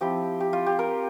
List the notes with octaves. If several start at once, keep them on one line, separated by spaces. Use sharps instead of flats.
F3 C4 E4 G4
G4
F4
G4
A#4